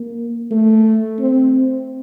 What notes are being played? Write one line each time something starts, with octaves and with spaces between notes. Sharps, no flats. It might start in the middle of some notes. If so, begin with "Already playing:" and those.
Already playing: A#3
A3
C4